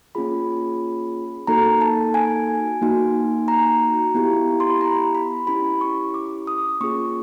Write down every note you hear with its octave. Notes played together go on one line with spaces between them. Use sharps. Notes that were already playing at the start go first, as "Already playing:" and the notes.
A#3 C#4 F4 G#4 B5
A#3 D#4 F#4 A4 A#5
A5
G#5
A#3 D#4 F#4
A#5
B3 E4 G4
C6
B5
A#5
B5
C#4 E4 G4 B5
C#6
D6
D#6
A#3 C#4 F4 G#4 C#6